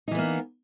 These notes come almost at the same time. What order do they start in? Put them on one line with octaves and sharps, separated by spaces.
D#4 E3 B3 A#3